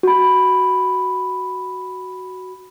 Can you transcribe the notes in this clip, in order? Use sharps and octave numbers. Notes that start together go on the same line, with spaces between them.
F#4 B5